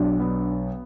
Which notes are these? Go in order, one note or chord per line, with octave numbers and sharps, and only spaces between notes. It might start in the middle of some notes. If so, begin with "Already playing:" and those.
Already playing: B1 D4
B3